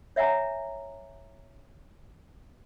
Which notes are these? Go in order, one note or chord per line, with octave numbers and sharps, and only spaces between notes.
C#5 E5 F#5 G#5 A#5